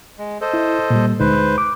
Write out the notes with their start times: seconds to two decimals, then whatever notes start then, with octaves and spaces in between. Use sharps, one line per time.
0.19 G#3
0.41 A4 C5 D#5
0.54 E4
0.90 A#2 G3
1.20 D2 G#3 D#4 B4 C5
1.58 D6